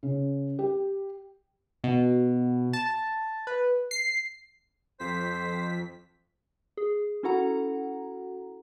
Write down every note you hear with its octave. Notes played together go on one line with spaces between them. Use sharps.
C#3
G4
B2
A5
B4
C7
F2 C5 B6
G#4
C#4 E4 F#4 A4 F#5 A#5